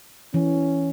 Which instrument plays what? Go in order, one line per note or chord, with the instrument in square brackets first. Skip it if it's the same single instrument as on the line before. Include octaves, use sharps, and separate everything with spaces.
[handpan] E3 [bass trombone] C#4